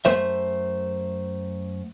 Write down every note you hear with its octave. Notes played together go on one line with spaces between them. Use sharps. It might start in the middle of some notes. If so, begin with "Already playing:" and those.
F#2 A3 C5 E5